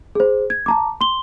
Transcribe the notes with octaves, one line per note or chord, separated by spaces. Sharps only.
G#4 C5
G#6
A5 A#5 D6
C6 G7